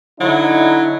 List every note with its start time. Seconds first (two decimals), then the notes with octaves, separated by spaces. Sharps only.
0.21 D3 F#3 D#4 E4